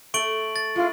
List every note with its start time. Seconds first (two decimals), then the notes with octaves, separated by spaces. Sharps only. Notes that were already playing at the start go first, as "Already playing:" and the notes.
0.14 A3 C#6 D7 F#7
0.56 A6
0.76 G#3 E4 F4